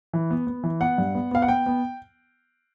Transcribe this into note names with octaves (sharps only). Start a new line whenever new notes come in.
E3
B3
B3
E3
B3 F#5
G2
B3
B3 F5
F#5
B3 G5
B3